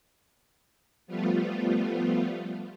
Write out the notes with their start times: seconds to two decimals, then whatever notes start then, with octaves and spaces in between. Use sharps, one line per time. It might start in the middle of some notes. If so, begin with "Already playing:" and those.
1.07 F3 G3 A3 B3 F4